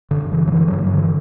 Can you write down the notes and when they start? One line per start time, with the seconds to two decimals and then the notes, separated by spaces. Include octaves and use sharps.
0.11 F#2 D3
0.32 C#3 E3
0.47 F#3
0.52 D3 E3
0.68 G2 F#3
0.83 F#3
0.94 D3 E3